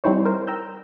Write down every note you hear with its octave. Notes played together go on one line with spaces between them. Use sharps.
G3 C4 D#4 E4 C5 C#5
A#4 C5
G5 A#5 E6 G6